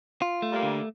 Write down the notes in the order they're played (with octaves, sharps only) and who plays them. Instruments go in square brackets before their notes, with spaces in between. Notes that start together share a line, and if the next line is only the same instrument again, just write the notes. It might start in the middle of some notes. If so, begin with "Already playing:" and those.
[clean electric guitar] F4
A3
[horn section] G3 A#3
[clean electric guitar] D3